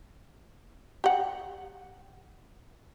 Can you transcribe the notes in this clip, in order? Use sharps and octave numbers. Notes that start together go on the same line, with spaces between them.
G4 F#5